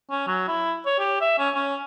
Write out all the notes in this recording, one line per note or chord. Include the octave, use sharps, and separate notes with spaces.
C#4
F#3
E4
C#5
G4
E5
C#4
C#4